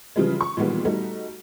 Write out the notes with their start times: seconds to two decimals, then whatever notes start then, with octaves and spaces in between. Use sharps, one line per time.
0.16 C#3 E3 F3 G3 G#3
0.41 C#6
0.57 A#2 D#3 E3 G3 G#3 B3
0.85 G3 A3 D#4 F#4